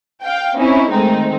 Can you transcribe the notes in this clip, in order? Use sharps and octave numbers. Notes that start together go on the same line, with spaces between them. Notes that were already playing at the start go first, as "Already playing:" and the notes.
F5 G5
C4 C#4 D#4 E4
D#3 G#3 A3 C4 D#4